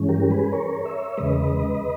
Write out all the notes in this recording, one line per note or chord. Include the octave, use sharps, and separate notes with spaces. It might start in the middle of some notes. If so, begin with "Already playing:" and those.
Already playing: G2 E3 G#3 C#4
G4 A#4
A#4
G#4 B4
A#4 C#5
C#5 E5
E2 C#3 G#3 B4 D#5